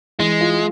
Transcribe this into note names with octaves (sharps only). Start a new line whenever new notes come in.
E3 G#3
F4